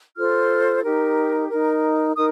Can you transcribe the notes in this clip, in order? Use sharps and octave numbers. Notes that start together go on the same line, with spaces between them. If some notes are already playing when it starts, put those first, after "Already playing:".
F4 A4 C5 F6
D#4 G4 A#4
D#4 A#4
D#4 A#4 D#6